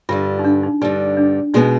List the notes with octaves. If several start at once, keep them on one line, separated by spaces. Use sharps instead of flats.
G2 D3 G3 F4
D#4
D4
D#4
G2 D3 G3 D#4
D4
B2 G#3 B3 D#4